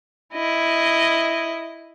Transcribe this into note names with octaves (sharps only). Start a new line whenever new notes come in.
E4 D#5